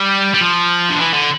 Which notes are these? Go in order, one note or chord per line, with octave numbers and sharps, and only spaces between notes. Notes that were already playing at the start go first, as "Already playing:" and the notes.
Already playing: G3
G3
F3
D3
E3
D3